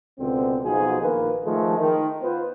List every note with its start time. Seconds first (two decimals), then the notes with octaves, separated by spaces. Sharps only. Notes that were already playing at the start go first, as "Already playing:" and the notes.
0.19 C#2 B2 D3 C4
0.64 B1 B2 F3 D#4 F#4 G#4
1.01 A#1 D#3 A#3 B4
1.44 D#3 F3 G#3 A3
1.78 D#3
2.22 B3 F4 B4 C5